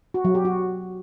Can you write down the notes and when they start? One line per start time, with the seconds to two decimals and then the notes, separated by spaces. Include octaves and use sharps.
0.14 F#4
0.25 F#3
0.35 G4
0.45 F#4